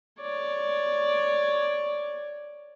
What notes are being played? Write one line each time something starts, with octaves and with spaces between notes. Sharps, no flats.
C#5 D5